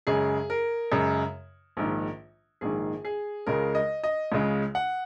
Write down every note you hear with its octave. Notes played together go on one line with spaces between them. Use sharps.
F#2 C#3 G#3 G#4
A#4
F#2 C#3 G#3
A#1 G#2 D#3
A#1 G#2 D#3 G#4
G#4
C#2 C#3 G#3 A#4
D#5
D#5
C#2 C#3 G#3
F#5